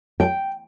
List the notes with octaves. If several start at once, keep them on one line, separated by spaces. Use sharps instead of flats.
G5